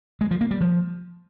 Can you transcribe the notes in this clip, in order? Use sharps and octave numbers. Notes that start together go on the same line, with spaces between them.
G#3
F3
A#3
G3
F3